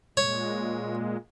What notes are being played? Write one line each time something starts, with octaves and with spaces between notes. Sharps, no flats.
A#2 G#3 C#5